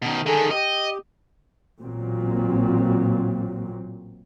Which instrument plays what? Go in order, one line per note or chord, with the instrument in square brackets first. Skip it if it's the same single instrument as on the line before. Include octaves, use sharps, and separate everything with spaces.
[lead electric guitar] B2 D#3
[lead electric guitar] D3 D#3 [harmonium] G#4 A4
[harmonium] G4 [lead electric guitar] D#5
[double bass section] A1 A#2 F#3 C4